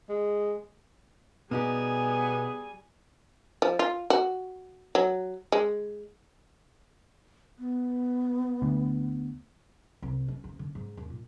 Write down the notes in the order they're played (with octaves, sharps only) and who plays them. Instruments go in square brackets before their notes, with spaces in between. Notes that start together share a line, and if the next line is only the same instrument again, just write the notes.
[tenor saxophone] G#3
[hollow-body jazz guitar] B2 D#4 G4 [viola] G3 G#5 [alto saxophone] B3 [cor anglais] G#4
[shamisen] F3
F4
F#4
F#3
G#3
[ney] B3
[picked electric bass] D2
[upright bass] C2
A3
D2
D3
G#2
D#2
A#2